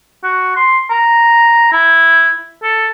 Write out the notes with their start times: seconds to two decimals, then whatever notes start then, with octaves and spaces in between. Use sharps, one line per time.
0.23 F#4
0.56 C6
0.90 A#5
1.72 E4
2.63 A4